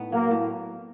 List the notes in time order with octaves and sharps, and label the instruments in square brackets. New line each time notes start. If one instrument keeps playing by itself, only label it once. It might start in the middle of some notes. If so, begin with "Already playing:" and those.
Already playing: [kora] A2 B3 D#4
[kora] F#3 [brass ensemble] A#3
[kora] A2